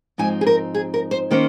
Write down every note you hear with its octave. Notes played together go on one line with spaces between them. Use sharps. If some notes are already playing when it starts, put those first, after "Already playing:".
G#2 F3 C4 D#4 G#5
G#4
A#4
G#4
A#4
C5
D#3 A#3 C#4 C5